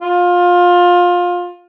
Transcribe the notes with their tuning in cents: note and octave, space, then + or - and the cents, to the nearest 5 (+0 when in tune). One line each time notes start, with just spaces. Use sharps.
F4 +20